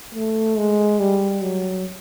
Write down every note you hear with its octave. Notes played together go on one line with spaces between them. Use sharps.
A3
G#3
G3
F#3